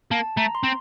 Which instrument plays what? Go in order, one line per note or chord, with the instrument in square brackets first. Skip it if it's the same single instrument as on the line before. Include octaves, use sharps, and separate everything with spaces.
[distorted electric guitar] A#3 [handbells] A5
[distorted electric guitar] A3 [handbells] A#5
[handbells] C6
[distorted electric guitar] C4